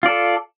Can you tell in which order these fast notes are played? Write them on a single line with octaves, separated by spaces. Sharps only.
F4 D5 A4